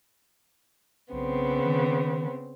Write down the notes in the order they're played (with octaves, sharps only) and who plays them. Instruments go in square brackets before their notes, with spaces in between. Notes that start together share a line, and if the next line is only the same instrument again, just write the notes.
[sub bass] B1 [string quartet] C#3 B3 C4
[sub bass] D#3